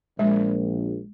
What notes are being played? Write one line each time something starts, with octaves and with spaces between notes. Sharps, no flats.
A#1 G#3